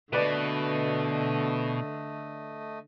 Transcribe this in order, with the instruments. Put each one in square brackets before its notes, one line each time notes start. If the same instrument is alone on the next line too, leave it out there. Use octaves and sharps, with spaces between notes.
[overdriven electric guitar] B2 [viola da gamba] D3 [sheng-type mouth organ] A3 D#5 [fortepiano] B4 D5